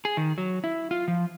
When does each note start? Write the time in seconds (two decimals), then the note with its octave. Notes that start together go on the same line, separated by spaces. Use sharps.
0.05 G#4
0.17 D#3
0.38 F#3
0.64 E4
0.91 F4
1.08 F3